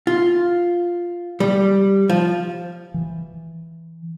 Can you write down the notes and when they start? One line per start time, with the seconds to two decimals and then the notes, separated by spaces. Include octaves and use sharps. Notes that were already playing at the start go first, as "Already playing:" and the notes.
0.07 F4
1.40 G3
2.09 F3
2.94 E3